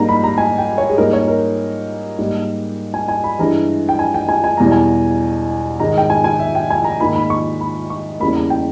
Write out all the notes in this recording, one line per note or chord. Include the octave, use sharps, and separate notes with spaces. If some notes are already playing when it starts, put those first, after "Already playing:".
Already playing: G#2 G3 A#3 A#5
B5
A#5
G#5
G5
C#5
G#4
G#2 G3 A#3 A#4
C#5
A#4
G#2 G3 A#3
G#5
G#5
B5
G2 E3 G#3 A#5
G5
G#5
G5
G#5
G#5
E2 B2 G3 A#5
G#5
G#2 D#3 G#3 A#5
G5
G#5
G#5
E5
G5
G#5
A#5
G#2 D#3 A#3 B5
B5
C#6
B5
C#6
E2 C#3 G3 A#3 B5
A#5
G5